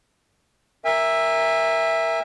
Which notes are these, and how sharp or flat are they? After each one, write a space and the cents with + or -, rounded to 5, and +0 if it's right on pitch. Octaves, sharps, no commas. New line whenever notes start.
A#4 +0 E5 +0 G#5 -40